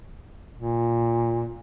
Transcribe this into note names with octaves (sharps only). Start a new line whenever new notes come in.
A#2